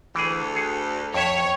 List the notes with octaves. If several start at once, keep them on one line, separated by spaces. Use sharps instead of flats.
D2 E3 G#4
G#4 F#5
F2 C#5 E5 G5